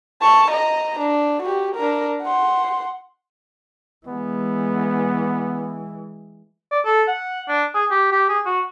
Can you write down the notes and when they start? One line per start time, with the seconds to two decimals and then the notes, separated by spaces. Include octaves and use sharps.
0.21 A5 C#6
0.51 D#5 A#5
0.99 D4
1.42 F#4 G4
1.75 D4 A#4
2.22 F#5 C6
4.07 E3 G#3 B3
6.71 D5
6.85 A4
7.08 F#5
7.48 D4
7.75 G#4
7.91 G4
8.12 G4
8.29 G#4
8.46 F#4